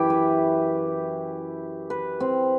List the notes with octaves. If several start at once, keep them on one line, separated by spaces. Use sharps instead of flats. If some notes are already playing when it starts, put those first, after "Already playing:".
Already playing: F#2 E3 E4 G4
B4
B4
C4